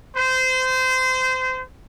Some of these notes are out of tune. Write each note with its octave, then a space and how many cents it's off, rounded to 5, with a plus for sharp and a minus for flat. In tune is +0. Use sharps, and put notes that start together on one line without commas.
C5 -25